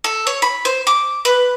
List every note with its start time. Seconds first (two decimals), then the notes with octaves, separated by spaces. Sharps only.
0.04 A4
0.27 C#5
0.42 B5
0.65 C5
0.87 D6
1.25 B4